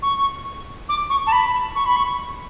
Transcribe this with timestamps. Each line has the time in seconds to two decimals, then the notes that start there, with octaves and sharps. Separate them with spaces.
0.02 C#6
0.89 D6
1.10 C#6
1.27 A5
1.32 B5
1.75 C#6
1.86 B5
1.96 C#6